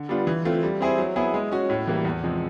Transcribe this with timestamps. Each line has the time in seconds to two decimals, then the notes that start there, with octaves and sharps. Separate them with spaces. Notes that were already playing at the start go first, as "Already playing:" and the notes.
Already playing: D3
0.09 G3 B3 D4 F4
0.27 E3
0.45 A3 C4 F4
0.63 G3
0.80 C4 E4 G#4 C5
0.98 F#3
1.16 B3 E4 G#4
1.34 G#3
1.52 C#4 F#4
1.70 A2
1.87 E3 G3 A#3
2.05 E2
2.23 C3 F3 G#3